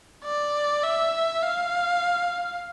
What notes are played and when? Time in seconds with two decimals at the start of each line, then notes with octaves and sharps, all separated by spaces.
0.24 D5
0.83 E5
1.42 F5